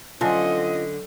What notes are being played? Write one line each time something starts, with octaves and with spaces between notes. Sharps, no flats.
D3 F#3 C#4 F4 C5 D#5 G#5 A5